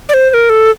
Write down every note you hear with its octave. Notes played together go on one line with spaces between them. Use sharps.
D5
C5
C5
A#4
A4